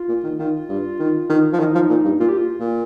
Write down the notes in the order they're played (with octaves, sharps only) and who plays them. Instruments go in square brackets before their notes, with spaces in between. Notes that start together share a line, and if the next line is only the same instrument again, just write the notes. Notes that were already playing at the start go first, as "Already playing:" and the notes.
Already playing: [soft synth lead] F4
[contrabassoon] A#2
D#3
[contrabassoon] D#3 [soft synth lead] F4
[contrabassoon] G2
D#3
D#3
F3
[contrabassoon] D#3 [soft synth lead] D#4
[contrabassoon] F3
A#2
G2
[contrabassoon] A#2 [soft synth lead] F4
[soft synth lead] G4
F4
[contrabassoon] A#2